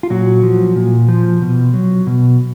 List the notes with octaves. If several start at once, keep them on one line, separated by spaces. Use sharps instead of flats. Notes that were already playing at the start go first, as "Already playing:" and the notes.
F4
A#2 F#3 F#4
F3
A#2
F3
B2
F#3
B2